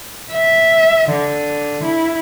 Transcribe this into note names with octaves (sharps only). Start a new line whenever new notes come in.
E5
D3
E4